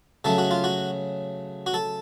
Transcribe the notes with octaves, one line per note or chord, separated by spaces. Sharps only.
C#3 F#3 A3 A4
F#4
F4
F#4
F#4
A4